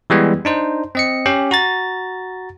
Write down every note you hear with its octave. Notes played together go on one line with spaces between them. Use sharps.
E3 G3 G#3 B3
D4 D#4 C5
C4 D#5 C#7
C#4 G4
F#4 A#5 A6